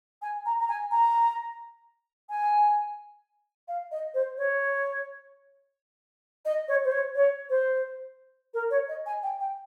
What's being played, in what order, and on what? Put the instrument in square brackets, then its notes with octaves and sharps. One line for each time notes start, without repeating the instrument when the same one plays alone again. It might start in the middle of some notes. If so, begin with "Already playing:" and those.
[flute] G#5
A#5
A#5
G#5
A#5
G#5
F5
D#5
C5
C#5
D#5
C#5
C5
C#5
C#5
C5
A#4
C#5
D#5
G#5
G5
G5